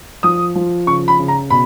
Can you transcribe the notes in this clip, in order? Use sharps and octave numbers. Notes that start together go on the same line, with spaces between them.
F3 D#6
F3
C#3 C#6
B5
C#3
A#5
B2 B5